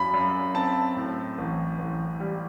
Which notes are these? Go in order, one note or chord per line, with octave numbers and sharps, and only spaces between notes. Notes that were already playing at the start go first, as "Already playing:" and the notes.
Already playing: F#2 B5
F#2
C4 A5
A2
A1
A1
G3